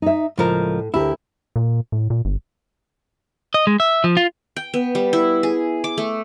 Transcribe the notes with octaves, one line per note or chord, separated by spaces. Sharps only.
D#4 E5
C#2 A2 F3 A#4
D2 E4 G4 A#4
A#2
A2
A#2
G1
D#5
G#3
E5
F3
F4
G5
B3
G3
E4
G#4
D6
A3